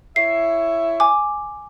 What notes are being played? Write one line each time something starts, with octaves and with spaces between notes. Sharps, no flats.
E4 C#5 E5 C7
G#5 D6